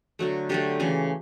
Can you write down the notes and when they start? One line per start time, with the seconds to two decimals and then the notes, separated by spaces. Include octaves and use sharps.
0.19 D3 F#3 A3
0.49 D3 F#3 A3 G4
0.80 C#3 E3 A3